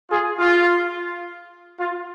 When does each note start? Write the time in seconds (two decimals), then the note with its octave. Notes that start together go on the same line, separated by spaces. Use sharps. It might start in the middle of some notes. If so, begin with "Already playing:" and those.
0.10 F4 G#4
0.39 F4
1.79 F4